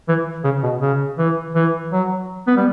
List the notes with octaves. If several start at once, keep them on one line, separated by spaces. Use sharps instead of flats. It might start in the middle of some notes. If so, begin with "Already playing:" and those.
E3
C#3
B2
C#3
E3
E3
F#3
B3
G3